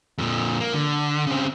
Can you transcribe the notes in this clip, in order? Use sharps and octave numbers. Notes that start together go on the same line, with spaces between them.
F2 A#2
A#3
D3
C#3 C4